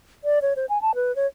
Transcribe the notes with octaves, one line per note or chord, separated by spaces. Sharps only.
D5
C#5
C5
G#5
A5
B4
C#5